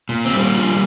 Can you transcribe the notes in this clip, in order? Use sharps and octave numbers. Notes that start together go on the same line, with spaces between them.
A#2
C4
G3
A#3
F3